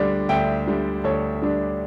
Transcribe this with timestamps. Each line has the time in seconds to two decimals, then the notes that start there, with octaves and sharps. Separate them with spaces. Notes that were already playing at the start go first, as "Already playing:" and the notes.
Already playing: D2 D3 G3 D4
0.29 D2 E5 G5
0.67 D3 G3 D4
1.04 D2 A4 C#5
1.42 D3 G3 D4